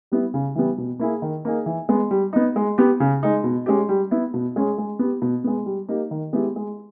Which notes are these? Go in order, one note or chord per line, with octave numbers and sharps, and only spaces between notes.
G3 B3 E4
C#3
E3 G3 B3
B2
A#3 E4 G#4
D#3
A#3 D#4 G#4
E3
G#3 B3
G3
B3 D#4
G#3
B3 G4
C#3
G#3 D#4
B2
G#3 C#4 G4
G3
B3 E4
B2
G#3 C#4 G#4
G#3
B3 G4
B2
G#3 B3
G3
A#3 D#4 G4
D#3
G#3 B3 E4 G4
G#3